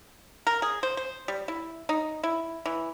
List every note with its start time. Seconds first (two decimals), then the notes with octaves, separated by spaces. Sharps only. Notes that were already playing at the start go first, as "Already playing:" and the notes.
0.47 A#4
0.62 G#4
0.83 C5
0.97 C5
1.28 G3
1.48 E4
1.89 D#4
2.23 E4
2.66 E3